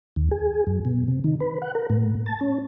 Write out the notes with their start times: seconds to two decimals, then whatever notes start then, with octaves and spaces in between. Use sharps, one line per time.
0.16 D#2
0.31 G#4
0.67 F#2
0.85 B2
1.08 C3
1.24 D#3
1.40 B4
1.62 F#5
1.75 A#4
1.90 A2
2.26 A5
2.41 C#4